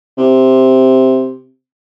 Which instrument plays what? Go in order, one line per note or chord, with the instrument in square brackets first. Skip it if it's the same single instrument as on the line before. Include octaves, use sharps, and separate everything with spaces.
[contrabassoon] C3